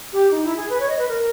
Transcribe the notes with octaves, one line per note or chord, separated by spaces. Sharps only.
G4
D#4
E4
G#4
B4
C#5
D#5
B4
A#4